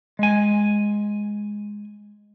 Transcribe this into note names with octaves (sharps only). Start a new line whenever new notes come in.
G#3 G#5